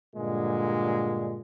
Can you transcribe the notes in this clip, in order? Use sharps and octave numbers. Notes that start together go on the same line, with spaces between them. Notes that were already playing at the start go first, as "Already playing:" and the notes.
G2 A#2 D3 G#3